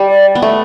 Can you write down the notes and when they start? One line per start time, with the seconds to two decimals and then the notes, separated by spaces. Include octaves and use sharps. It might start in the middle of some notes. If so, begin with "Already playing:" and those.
Already playing: G3
0.09 D5
0.35 B3
0.42 A3